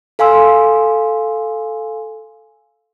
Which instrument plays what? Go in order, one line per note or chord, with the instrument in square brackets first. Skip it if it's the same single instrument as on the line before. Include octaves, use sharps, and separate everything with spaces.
[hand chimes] A4 F5 G#5 C6 E6